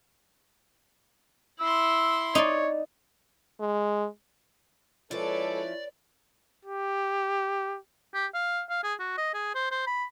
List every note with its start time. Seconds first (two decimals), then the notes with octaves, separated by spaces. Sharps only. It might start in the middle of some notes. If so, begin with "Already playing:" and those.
1.60 E4 C6 E6
2.35 D#4 C#5 D5
3.61 G#3
5.11 F3 G#3 C#4 E4 A4 B4 C#5 D5
6.65 G4
8.14 G4
8.34 F5
8.70 F5
8.84 G#4
9.00 F#4
9.18 D#5
9.34 G#4
9.55 C5
9.71 C5
9.87 B5